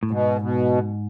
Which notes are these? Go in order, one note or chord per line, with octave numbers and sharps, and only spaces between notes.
A2
G#2 B2
B2